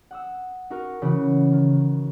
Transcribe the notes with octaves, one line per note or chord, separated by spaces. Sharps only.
F#5 D#6 E6
D#4 F#4 A#4
C#3 E3 F#4
D#3